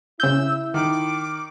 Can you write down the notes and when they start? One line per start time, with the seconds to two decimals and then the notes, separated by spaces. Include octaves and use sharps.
0.20 C#3 E4 E6 G6
0.74 D#3 D6